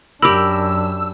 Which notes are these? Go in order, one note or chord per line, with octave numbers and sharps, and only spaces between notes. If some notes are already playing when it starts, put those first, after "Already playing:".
F#2 D4 G4 A#4 B5 E6